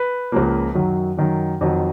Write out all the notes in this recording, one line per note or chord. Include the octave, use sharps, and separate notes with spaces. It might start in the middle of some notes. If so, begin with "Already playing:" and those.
Already playing: B4
C#2 C#3 F3 A#3
F#2 D#3 F#3
F#2 D#3 F#3
F2 D#3 F#3